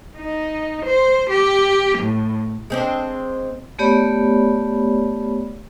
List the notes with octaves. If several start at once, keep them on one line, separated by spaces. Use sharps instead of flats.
D#4
C5
G4
A2
G#3 C4 D4
A3 B3 G4 C#5 D5 B5